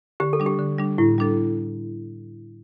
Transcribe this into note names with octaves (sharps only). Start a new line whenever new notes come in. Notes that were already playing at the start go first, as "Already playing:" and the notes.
D3 G4
A4
G3 D4
G4
D3
G3 D4
A2 E4
G3 D4 A4